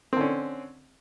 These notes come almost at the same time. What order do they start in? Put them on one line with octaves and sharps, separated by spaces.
C4 D3 C#4